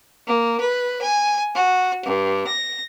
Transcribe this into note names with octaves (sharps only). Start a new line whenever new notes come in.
A#3
B4
G#5
F#4
G2
A#6